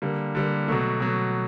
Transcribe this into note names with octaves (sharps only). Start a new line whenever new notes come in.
D3 G3 A#3
D3 G3 A#3
B2 F#3 A3
B2 F#3 A3